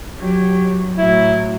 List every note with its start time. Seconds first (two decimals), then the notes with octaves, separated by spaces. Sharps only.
0.18 F#3 G4
0.98 A2 F#3 E4